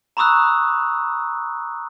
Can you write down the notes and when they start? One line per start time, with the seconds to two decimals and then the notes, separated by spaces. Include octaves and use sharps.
0.17 A#5 B5 C#6 D#6 E6 F#6